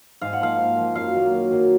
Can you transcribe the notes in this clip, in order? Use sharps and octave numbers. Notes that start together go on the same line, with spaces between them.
G#2 F5
F#5
F3 A#3 F5
G#2
F3 A#3
F#2 F5
D#3 F#3 A#3
F#2
D#3 F#3 A#3